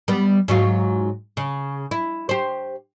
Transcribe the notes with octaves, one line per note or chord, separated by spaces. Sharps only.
G3 B3
G#2 F#3 F4
C#3
E4
G4 C5